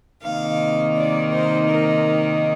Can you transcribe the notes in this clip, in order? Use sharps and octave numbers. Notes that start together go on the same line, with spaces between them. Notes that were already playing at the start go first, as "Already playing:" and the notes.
C3 D#3 A#3 D#4 F5
D5
C5
A#4